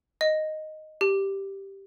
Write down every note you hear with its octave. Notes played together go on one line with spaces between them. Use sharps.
D#5
G4